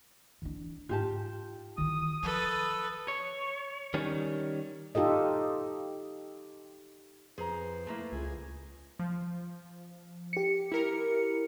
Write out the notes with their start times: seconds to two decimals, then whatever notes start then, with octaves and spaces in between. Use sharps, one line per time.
0.42 E3 D4
0.89 G#2 F4 G4 A5
1.78 D#3 E3 D#6
2.23 F3 A4 B4
3.08 C#5
3.94 D#3 G3 C#4
4.95 D#4 F4 G4 A4 D#5
7.38 F2 G#4 B4 C5 A#5
7.87 A3 A#3 E4
8.12 C#2 F4 G#4
8.99 F3
10.33 G4 C#7
10.72 E4 A#4